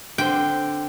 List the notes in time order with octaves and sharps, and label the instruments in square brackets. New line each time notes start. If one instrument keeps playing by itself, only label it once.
[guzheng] D3 C4 [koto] G5